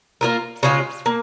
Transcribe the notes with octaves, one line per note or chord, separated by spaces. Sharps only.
A#3 F4 A#4
C#3 G#3 F4
A#3